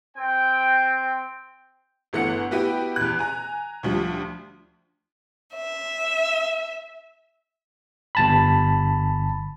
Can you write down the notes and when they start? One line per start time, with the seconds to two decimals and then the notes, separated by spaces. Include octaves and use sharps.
0.16 C4 G5
2.13 G1 E3 A3 B3 F#5 C#7
2.51 B3 E4 F#4 G4 B4 G5
2.96 E2 F#6
3.19 G#5 A#5
3.83 D2 F3 G3
5.55 E5
8.15 G1 A5 B5